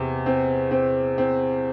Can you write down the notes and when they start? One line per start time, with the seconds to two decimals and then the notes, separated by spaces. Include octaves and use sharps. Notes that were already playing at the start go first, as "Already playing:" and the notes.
Already playing: E2 C3
0.26 C4
0.71 C4
1.18 C4